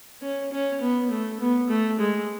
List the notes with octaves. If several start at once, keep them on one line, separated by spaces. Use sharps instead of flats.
C#4
C#4
B3
A3
B3
A3
G#3